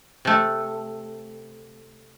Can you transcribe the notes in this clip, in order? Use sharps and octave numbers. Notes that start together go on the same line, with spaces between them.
C3 A3